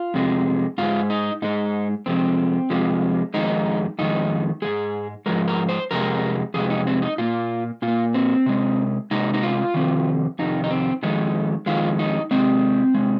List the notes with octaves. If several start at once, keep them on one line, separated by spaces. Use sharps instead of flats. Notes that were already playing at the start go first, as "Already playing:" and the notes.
Already playing: F4
F2 C3 G#3
G#2 G#3 F4
D#4
G#2 G#3 D#4
F2 C3 F3 G#3 C4
F2 C3 F3 G#3
F2 D#3 G#3 D#4
F2 D#3 G#3 D#4
G#2 F3 G#3 G#4
G#2 F3 G#3 A#4
A#4
C5
F2 C3 G#3 A#4
F2 C3 G#3 G#4
D#4
C4
D#4
A#2 A#3 F4
A#2 F4
A#3
C4
C3 G#3
C3 G#3 D#4
D#4
F4
F2 C3 D#3
F2 C3 D#3 D#4
D#4
C4
F2 D#3 G#3 D#4
F2 D#3 G#3 F4
D#4
C3 G#3 C4
C3 G#3